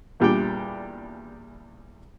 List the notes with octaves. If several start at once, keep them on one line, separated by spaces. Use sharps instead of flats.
E2 A#2 G3 D4 G4 G5